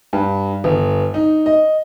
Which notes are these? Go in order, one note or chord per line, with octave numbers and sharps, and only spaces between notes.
G2
G1
D#4
D#5